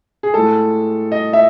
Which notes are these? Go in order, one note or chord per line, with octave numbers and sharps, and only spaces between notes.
G#4
A2 G#3 A4
D#5
E5